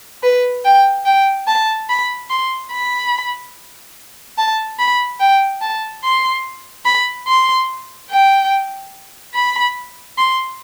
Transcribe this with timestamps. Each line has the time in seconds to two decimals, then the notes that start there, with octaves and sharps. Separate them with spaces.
0.23 B4
0.65 G5
1.05 G5
1.47 A5
1.89 B5
2.30 C6
2.71 B5
4.38 A5
4.79 B5
5.20 G5
5.61 A5
6.04 C6
6.85 B5
7.27 C6
8.10 G5
9.34 B5
10.18 C6